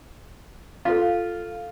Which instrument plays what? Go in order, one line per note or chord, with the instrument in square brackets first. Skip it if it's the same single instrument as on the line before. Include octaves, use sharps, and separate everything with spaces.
[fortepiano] F4 [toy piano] A4 F5